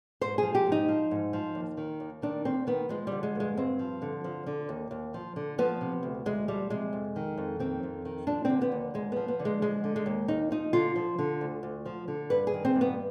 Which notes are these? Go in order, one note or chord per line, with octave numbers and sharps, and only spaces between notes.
G#2 C5
F3 G#4
G4
G#2
D#4
F3
G#2
F3
D#2
D#3
D#2
D#3 D4
D#2 C4
D#3 B3
F3 G#3
D3 G3
G#3
G2 G#3
G2 C4
F3
D3
F3
D3
D#2
D#2
F3
D3
F3 B3
C3
D2
D2 G#3
F3 G3
C3 G#3
F2
D#3
F2
D#3 C4
F2
D#3
F3 D4
D3 C4
B3
D#2
D#2 G#3
F3 B3
B3
D3
G#3
F3 G#3
D3
G#3
D#2
D#2 D#4
F3 D#4
D3 F4
F3
D3
D2
D2
F3
D3
G2 B4
G#4
D#3
C4
G2
B3